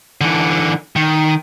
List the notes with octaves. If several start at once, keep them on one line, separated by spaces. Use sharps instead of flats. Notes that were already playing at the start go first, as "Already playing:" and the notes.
D3 E3
D#3